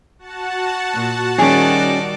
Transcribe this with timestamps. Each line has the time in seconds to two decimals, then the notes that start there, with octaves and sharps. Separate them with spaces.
0.19 F#4 F#5 A5
0.93 A#2
1.38 D#3 G3 C#4 G#4 D5